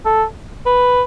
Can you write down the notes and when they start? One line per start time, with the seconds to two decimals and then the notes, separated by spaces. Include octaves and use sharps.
0.06 A4
0.66 B4